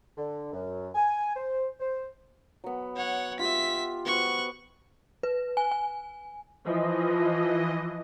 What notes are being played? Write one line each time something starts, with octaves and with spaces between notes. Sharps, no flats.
D3
F#2
G#5
C5
C5
F#3 B3
C#5 F#5
F4 G4 E5 B6
B3 F#4 C5 C#6 F#6
B4
G#5
G#5
E3 F3 D#5